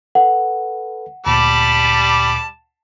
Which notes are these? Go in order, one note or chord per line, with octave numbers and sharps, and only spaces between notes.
A4 B4 F#5
D2 A#2 G3 A5 B5 D6